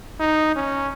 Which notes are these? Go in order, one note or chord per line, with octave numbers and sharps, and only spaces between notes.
D#4
C#4